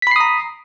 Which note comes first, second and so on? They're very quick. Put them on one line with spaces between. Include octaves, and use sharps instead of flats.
B6 B5 C7 D#6 A#5